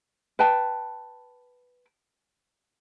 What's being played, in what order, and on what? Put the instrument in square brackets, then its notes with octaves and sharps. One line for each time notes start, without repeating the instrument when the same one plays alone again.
[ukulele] B4 G5 A5